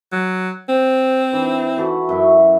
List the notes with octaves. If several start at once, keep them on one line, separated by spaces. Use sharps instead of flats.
F#3
C4 C5
E3 D4
E3 F#4 A4 F#5
F#2 E4 E5